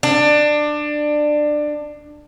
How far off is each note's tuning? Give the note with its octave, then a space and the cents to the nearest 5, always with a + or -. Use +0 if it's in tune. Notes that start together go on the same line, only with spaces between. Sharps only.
D4 +20